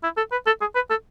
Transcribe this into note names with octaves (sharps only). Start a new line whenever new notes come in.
E4
A4
B4
A4
G#4
B4
A4